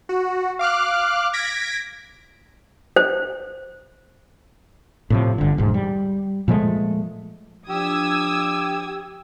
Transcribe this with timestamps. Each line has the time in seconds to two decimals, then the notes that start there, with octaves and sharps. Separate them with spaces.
0.09 F#4
0.59 F5 D6 F6 F#6
1.33 G#6 A#6 B6 D7
2.96 C5
5.10 A2 C3 F3
5.38 G1 D3
5.58 E1 G#2
5.74 G3
6.48 A#2 F3 G#3 A3
7.69 F3 D4 G4 D#6 E6 G#6